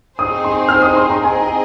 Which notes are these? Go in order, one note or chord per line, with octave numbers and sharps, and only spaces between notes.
C4 D#4 G#4 C5 D#6
C6
F6
D#6
C6
A#5
C4 G#4 D#5 G#5
A#5